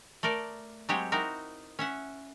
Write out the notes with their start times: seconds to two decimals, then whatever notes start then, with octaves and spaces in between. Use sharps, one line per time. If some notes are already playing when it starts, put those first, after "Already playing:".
0.23 A3 A4 A#4 D5
0.89 F#3 G#3 C4 G4 C#5
1.12 C4 D#4 E4 F#4 A#4
1.79 C#4 E5 F#5